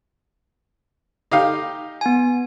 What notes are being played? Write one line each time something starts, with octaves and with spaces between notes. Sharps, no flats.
D#4 G4 F5
B3 G#5